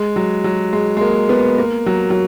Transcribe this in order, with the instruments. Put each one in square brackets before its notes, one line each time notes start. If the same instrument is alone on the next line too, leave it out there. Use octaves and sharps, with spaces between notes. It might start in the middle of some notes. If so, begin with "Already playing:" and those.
Already playing: [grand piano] G#3
F#3
F#3
G#3
G#3
A#3
B3
A#3
F#3
F#3